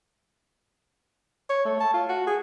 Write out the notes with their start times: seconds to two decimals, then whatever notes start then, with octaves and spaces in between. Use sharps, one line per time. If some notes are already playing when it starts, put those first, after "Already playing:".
1.50 C#5
1.65 A3
1.80 A5
1.94 F4
2.09 F#4
2.27 G#4